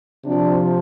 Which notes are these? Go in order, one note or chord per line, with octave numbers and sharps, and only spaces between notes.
C3 F3 D4